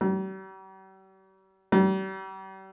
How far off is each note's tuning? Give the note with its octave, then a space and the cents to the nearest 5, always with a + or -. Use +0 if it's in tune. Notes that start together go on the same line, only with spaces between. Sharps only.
G3 -45
G3 -40